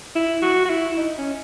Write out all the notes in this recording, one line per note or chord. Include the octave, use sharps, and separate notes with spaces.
E4
F#4
F#4
E4
D#4
C#4